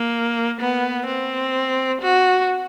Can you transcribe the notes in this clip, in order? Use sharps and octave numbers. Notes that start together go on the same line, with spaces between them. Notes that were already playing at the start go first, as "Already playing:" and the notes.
Already playing: A#3
B3
C4
F#4